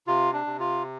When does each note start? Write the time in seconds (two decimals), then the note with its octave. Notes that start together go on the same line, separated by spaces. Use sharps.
0.07 C3 F4
0.33 D4
0.46 C3
0.59 F4